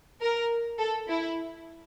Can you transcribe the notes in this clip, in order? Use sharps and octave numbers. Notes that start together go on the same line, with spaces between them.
A#4
A4
E4